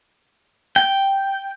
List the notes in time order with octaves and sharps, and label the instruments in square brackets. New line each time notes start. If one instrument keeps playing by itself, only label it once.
[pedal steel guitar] G5